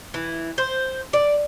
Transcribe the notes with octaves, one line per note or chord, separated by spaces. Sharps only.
E3
C5
D5